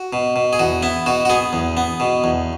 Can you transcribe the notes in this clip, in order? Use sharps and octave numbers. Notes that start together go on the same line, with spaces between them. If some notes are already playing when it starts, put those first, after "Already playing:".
Already playing: F#4
B2
B2
G#4
E2 F#4
B3 E4
B2 F#4
F#4
B3 G#4
E2
B3
B2
E2